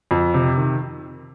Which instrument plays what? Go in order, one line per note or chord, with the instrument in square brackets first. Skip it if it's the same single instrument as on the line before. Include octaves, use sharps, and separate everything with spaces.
[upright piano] F2
C3
D#3